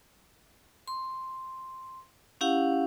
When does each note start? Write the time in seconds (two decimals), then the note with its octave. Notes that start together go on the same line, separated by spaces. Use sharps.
0.87 C6
2.41 C#4 E4 G4 F5 F#5